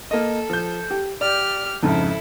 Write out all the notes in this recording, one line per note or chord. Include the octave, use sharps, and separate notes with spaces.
A#3 A4 D#5
F3 G6
G4
G4 D5 F6
F2 G#2 C#3 E4 A4